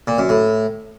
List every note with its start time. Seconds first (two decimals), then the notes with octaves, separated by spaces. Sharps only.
0.07 A#2
0.18 F#2
0.29 A2